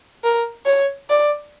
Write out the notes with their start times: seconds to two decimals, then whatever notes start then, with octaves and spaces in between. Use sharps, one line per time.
0.24 A#4
0.66 C#5
1.10 D5